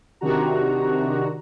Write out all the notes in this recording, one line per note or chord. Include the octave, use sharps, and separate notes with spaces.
C3 D#3 D4 F#4 A#5